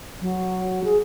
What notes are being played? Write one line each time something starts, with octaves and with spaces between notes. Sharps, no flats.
F#3
G#4